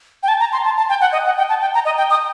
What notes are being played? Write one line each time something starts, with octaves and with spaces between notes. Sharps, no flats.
G5
A5
A#5
C6
A5
A5
G5
F#5
D#5
F#5
G5
A5
G5
A#5
D#5
G5
D#6